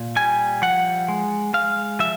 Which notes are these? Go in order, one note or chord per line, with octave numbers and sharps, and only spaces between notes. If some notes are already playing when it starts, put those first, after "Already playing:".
Already playing: A#2
G3 G#5
F3 F#5
G#3
G#3 F5
F3 E5